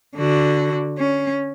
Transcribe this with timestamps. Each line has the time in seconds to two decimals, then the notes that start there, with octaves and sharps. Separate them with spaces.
0.16 D3 F#4
0.98 C#4